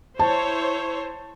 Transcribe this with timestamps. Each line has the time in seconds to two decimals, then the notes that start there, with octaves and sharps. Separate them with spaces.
0.19 E4 C5 C#5 A5